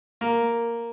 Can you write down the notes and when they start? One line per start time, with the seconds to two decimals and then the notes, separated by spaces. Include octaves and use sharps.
0.21 A#3